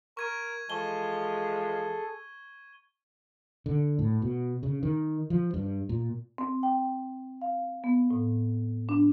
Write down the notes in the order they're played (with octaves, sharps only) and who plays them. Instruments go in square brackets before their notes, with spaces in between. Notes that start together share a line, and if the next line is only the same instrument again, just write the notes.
[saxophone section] A#4 [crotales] C#6 G#6 D#7
[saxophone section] E3 F3 G#3 [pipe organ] G#4 A4 [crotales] C#6 G7
[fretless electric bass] D3
A2
B2
C#3
D#3
F3
G2
A#2
[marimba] C4
G5
F5
B3
A2
D4